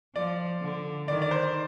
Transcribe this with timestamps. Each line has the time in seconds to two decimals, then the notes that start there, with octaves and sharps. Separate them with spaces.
0.16 F3 D5
0.62 D3
1.08 D#3 D5
1.22 D5
1.31 C5